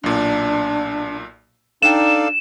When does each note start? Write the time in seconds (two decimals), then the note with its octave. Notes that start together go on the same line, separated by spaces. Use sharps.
0.04 B1 A#2 D4
1.82 D4 D#4 A4 D5 F5 G5 E7